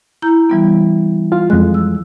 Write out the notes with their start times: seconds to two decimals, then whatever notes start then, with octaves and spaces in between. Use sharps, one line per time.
0.22 E4 A#5 G6
0.50 E3 G3 B3
1.32 F4 F5
1.50 F2 G#3 F#6
1.74 E6